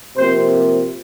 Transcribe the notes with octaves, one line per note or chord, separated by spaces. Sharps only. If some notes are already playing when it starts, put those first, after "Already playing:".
C3 F3 A#3 C4 C5